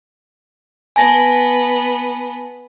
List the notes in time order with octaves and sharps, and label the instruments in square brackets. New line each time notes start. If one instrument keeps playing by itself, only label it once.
[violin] B3 [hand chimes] G#5 A5 A#6